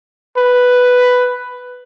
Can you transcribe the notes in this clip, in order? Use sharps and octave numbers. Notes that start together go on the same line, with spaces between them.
B4